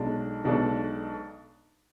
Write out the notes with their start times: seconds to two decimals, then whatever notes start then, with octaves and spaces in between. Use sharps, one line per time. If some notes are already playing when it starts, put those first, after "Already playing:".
Already playing: B1 B2 G#3 D4 A4
0.44 B1 B2 G#3 D4 A4